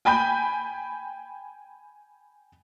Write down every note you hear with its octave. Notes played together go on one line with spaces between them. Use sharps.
G5 G#5 B5 G6